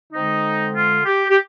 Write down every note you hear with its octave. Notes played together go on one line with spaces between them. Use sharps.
D3 G#3 C4 D#4
F4
G4
G4